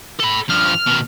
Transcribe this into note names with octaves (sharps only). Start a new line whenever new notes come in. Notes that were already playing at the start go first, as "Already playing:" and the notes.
A4 B5
G2 F3 F6
B2 D#3